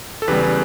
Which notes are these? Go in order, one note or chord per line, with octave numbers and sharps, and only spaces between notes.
A4
E2 C#3 G3 G4 B4